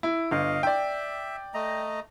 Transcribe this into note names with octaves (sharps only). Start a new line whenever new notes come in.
E4
G1 D#5 F5
D5 E5 G5
A3 D#5 A#5